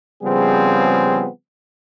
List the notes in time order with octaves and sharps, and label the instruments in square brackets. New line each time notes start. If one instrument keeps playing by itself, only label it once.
[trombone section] C#3 F3 G3 B3 C4 G#4